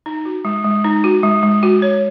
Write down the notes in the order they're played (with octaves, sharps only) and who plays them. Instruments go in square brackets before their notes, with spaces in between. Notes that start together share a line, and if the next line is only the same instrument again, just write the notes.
[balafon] D#4
F#4
G#3
G#3
D#4
F#4
G#3
G#3
F#4
C#5